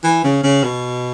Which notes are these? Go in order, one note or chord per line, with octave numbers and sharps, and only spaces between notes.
E3
C#3
C#3
B2